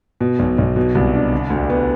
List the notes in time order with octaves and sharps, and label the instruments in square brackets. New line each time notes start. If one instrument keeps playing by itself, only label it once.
[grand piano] B2
B1
B1
B2
C2
D4
D3
D2
B3